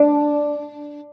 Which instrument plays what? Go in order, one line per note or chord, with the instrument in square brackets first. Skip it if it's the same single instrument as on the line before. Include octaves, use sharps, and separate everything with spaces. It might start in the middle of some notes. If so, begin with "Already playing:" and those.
Already playing: [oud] D4